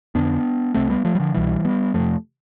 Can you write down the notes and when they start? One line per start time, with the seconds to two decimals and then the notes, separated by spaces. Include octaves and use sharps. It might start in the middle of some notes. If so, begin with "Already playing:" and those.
0.15 F2 D3 B3 D4
0.74 C2 C3 A3 C4
0.90 G3 B3
1.05 F3 A3
1.15 G3
1.20 D3 F3
1.34 C2 B2 E3 G3
1.65 G3 B3
1.94 F2 C3 F3 A3